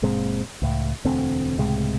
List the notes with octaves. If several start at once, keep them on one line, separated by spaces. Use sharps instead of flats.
F#1 A#2 G#3 C4
C#2 A2
E1 D2 A3 C4
C#2 A2 C3 G#3